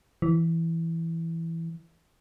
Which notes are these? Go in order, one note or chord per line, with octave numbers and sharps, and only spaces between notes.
E3